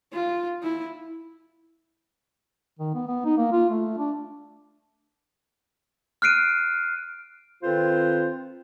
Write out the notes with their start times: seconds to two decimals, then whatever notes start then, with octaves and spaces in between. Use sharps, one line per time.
0.13 F4
0.63 E4
2.79 D#3
2.94 B3
3.07 B3
3.25 D#4
3.37 A#3
3.52 F4
3.70 A3
3.98 D4
6.22 F6 F#6 C7 D7 D#7
7.63 D#3 C4 F4 A4 B4 C5